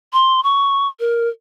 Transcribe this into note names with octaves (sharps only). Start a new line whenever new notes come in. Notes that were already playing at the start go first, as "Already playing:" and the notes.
C6
C#6
A#4